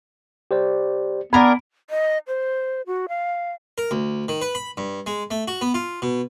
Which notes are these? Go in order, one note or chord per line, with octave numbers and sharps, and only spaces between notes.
G4 C5 D5
B3 D4 A#4 G#5 B5
D#5
C5
F#4
F5
A#4
D2
D#3
B4
B5
G2
G#3
A3
F#4
B3
F4
B2